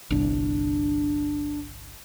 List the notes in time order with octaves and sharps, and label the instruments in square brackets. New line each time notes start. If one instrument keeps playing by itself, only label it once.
[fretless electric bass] G1 C2 [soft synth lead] D4